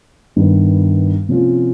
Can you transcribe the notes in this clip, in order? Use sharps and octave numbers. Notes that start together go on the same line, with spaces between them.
G2 D#3 G3 B3
C3 F3 A#3 C#4 F4